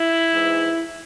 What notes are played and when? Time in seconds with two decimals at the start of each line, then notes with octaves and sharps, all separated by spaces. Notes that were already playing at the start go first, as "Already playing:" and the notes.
Already playing: E4
0.32 G#2 E3